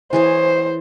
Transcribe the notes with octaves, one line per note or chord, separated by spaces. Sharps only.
E3 G#4 C5 C#5